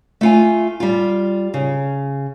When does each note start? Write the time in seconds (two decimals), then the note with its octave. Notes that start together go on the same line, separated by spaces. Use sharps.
0.21 A3 F4 G#5
0.80 G3 F4
1.54 C#3